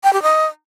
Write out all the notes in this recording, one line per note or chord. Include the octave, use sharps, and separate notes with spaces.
G5
G4
D#5